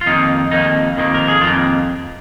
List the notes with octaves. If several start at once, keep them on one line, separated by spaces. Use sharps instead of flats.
F4
F2 D#3 A#3 D#4
F2 D#3 A#3 D#4
F2 D#3 A#3
A#4
G#4
F2 D#3 A#3 F4